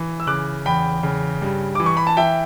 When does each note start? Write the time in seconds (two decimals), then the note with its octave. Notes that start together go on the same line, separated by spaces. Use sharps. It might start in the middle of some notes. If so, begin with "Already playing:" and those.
Already playing: E3
0.20 E6
0.27 C#3 D6 F#6
0.66 E2 G5 B5
1.03 C#3
1.42 G2
1.75 E3 D6
1.86 C#6
1.97 B5
2.07 A5
2.17 E3 E5 G5